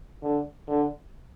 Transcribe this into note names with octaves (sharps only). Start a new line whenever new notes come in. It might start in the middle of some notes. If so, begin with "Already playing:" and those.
D3
D3